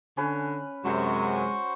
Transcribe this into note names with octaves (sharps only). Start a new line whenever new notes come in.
D3 C#4 B4
F#2 C3 G#3 F#4 C5 C#6